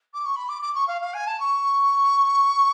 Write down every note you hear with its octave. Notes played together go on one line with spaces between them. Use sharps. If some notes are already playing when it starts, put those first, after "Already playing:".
D6
C#6
B5
D6
D6
C#6
F5
F5
G#5
A5
C#6